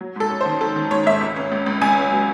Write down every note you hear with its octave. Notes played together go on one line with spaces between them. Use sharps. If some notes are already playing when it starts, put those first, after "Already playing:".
F#3
G#2 A4
C#4
C5
D#3
C#4 A4
D#3
G#2 C#5
G#2 E5
C#2
C#4
C#2
C#2
C#2 G#5
C#4
F#3